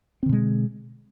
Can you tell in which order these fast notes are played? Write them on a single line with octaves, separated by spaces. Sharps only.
C4 D3 B2 G#3